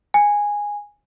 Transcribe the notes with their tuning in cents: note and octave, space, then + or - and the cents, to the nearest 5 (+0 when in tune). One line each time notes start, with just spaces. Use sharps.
G#5 -10